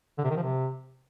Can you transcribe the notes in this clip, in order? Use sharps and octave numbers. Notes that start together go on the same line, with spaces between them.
D3
C3
D#3
F3
C3